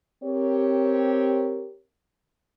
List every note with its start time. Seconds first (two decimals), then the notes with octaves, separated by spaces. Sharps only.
0.23 C4 G4 A#4 C#5